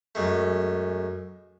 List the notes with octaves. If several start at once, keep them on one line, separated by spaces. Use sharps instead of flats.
F#2 G#3 A3